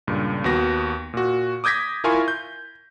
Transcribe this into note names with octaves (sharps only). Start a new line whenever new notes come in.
C#2 G2 A#2
D#2 B3 F#4 A#6
A#2 F#4
D6 D#6 G6 G#6 A#6 B6
E4 F4 A#4 G#5 C6 C#6
G6